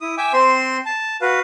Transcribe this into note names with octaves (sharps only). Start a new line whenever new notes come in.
E4 D#6
E5 G5 G#5 D6
C4 C5 C6
A5
F#4 B4 F5